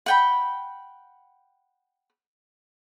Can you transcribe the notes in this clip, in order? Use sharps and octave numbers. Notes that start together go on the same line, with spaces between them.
F#5 G5 B5